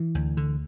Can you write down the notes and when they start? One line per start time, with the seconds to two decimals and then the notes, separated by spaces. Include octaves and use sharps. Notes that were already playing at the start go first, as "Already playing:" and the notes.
Already playing: E3
0.15 D2
0.37 D3